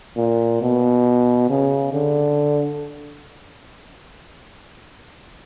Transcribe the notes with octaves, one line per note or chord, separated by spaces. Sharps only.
A#2
B2
C#3
D3